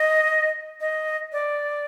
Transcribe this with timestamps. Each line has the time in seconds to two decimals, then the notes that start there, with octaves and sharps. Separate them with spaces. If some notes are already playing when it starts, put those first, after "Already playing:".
Already playing: D#5
0.80 D#5
1.32 D5